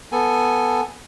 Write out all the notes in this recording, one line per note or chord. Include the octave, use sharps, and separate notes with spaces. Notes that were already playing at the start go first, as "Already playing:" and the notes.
B3 A4 G#5